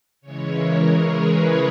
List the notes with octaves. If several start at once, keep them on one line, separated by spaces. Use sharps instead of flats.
C#3 E3 G#3 C#5
A#4
G#4
B4